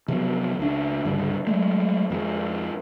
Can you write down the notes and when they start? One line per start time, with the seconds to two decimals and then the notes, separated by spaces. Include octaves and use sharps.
0.08 C3 F3 F#3 B3
0.59 C#2 D4
1.05 C#2 G2 D3
1.47 F#3 G#3 A3
2.10 F2 F3 G#3